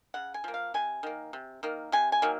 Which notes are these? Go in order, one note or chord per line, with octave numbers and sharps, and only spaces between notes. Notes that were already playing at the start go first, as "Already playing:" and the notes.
C#3 F#5
G#5
F3 A#3
F5
C3 G#5
D#3 A#3
C3
D#3 A#3
C3 G#5
G#5
D#3 F#3 A#3